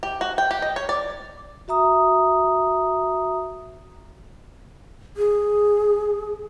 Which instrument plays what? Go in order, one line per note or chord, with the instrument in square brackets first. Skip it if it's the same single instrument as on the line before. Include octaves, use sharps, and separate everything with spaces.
[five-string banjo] G4
F#4
G5
G4
D#5
C#5
D5
[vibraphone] F#4 E5 A#5 D#6
[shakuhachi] G#4